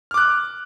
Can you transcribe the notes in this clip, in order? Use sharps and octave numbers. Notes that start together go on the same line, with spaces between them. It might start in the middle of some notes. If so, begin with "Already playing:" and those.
D6 F6 F#6